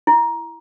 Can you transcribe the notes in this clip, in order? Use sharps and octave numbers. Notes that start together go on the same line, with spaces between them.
E4